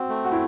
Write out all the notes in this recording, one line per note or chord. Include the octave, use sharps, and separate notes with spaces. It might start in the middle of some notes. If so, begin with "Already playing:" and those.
Already playing: C4 F#4
A3
F#4
E4